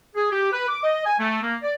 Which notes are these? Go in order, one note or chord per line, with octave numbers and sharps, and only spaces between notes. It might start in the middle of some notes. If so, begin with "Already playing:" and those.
G#4
G4
B4
D6
D#5
G#5
A3
A#3
D5